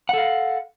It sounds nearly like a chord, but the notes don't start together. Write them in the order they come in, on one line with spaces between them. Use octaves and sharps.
F#5 A4 F5